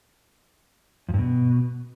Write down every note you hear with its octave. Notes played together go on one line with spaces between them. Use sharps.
F2
G2
B2